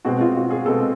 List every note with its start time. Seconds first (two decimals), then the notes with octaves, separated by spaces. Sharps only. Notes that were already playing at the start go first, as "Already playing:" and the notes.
0.05 B2 G#3 C4 F#4
0.21 F4
0.36 F#4
0.51 G#4
0.65 B2 G#3 C4 A4